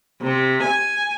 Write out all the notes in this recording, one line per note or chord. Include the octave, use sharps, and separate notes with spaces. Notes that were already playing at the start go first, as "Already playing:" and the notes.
C3
G#5